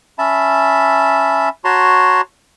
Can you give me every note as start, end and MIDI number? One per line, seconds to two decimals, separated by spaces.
0.19 1.49 61
0.19 1.49 76
0.19 1.49 81
0.19 1.49 83
1.65 2.21 66
1.65 2.21 73
1.65 2.21 81
1.65 2.21 82
1.65 2.21 84